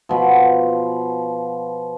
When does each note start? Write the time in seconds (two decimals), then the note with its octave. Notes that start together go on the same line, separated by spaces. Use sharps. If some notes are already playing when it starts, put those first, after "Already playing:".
0.09 B2 F3